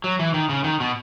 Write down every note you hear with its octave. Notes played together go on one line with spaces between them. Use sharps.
F#3
E3
D#3
C#3
D#3
B2